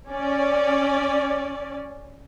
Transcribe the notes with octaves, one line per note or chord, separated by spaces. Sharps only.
C#4 D5